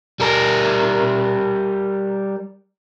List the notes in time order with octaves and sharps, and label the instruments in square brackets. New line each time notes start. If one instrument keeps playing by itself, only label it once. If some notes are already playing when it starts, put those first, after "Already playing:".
[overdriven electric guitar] G3 A#4